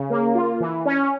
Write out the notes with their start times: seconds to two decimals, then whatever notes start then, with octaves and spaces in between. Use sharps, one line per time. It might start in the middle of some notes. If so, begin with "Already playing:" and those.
Already playing: C#3
0.10 A#3
0.35 F4
0.60 E3
0.85 C#4